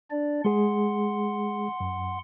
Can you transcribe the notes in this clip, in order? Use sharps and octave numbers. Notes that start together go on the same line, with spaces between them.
D4 D5
G#3 G#4 F#5 C6
F#2